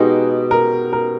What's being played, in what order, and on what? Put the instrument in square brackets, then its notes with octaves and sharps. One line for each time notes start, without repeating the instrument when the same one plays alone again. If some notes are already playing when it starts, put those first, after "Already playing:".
Already playing: [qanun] B2 G#3 D#4 [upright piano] G4
[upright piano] A#4
A#4